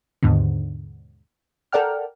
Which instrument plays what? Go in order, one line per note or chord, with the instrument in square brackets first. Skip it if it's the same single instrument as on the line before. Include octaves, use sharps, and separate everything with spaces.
[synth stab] D#2 G#2 B2 D3
A4 A#4 D5 F#5 G5 F6